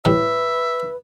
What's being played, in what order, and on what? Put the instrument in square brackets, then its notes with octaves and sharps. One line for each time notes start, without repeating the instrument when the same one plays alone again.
[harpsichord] A2 E3 G3 [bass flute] B4 [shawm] E5